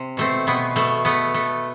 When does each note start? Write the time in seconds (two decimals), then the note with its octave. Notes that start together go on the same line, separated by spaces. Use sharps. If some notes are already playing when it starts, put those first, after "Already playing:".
Already playing: C3
0.17 B2 A3 C4
0.47 B2 B3
0.76 B2 A3
1.05 A3 B3
1.34 A3